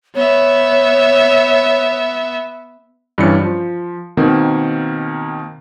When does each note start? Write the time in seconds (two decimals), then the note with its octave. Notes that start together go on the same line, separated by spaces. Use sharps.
0.15 B3 C#5 E5
3.18 G2 E3 G3 C#4 C#7
3.42 F3
4.17 B2 D#3 A#3 C4